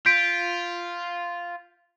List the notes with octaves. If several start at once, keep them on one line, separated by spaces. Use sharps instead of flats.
F4 G6 B6 D7